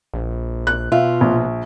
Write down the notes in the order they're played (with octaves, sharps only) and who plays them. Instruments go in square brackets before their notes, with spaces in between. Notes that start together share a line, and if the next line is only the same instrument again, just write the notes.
[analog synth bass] A#1
[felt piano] F#6
[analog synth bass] B2 [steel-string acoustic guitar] F4 [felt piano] E5
[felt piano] A#1